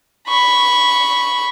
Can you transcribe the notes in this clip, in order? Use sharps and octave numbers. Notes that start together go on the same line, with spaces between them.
B5 C#6